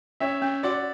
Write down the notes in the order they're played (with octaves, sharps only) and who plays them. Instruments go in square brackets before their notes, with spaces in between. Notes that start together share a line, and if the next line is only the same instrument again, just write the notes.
[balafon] C#4 [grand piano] C#5 E5
[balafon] C#4
[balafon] F#4 [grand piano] D5 F#5